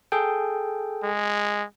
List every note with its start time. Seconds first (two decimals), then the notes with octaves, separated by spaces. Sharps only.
0.12 G#4 A4 G5
1.03 G#3